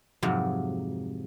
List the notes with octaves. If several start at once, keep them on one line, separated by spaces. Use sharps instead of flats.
F2 G#2 C3 F#3